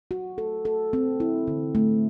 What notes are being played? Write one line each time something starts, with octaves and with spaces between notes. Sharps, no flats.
F#4
A4
A4
C4
E4
D3
A3